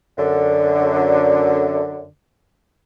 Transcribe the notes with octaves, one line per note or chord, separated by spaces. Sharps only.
F#2 D3